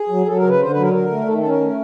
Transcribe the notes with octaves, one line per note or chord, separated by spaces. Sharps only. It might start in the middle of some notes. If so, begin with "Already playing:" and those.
Already playing: G#4
F#3
F#3 A4
A#4
C#3
B4
D3 C5
B4
F#3
A#4
D3 A#4
A3
D#3 A4
A4
C#4
A#4
A3